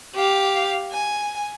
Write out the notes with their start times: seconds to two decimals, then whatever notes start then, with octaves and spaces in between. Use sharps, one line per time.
0.15 G4 F5
0.91 G#5